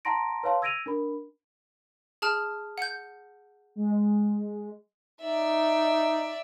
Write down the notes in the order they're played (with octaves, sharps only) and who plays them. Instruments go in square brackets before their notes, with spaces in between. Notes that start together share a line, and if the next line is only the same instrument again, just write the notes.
[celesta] F#5 A5 A#5 C6 A#6 D7
B4 C#5 F5 A5 C6
E6 G#6 A#6 D7 D#7 F7
D4 A#4 B5
[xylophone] G#4 A5 F6
F#5 G6
[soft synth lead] G#3
[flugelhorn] D#4 [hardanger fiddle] D5 E5